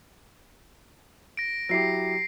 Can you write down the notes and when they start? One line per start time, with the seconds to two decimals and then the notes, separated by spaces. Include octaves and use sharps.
1.37 A#6 D7
1.69 F#3 E4 G4 A#6 C7